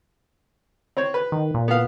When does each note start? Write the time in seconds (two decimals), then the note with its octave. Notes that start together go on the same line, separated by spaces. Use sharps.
0.97 C4 C5 C#5
1.14 B4
1.32 D#3
1.54 A#2
1.68 B3 F5